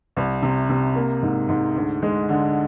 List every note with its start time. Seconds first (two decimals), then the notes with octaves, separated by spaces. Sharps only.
0.17 C2
0.42 C3
0.69 C3
0.96 A#3
1.22 G#2
1.49 G#2
1.76 D2
2.02 G#3
2.29 D3